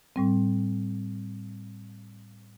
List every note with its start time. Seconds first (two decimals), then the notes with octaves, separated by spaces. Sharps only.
0.16 A2 G3 C4